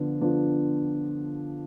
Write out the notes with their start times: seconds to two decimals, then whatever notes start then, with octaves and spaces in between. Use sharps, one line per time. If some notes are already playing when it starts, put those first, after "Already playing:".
Already playing: D3 F3 B3 D4
0.21 D3 F3 B3 D4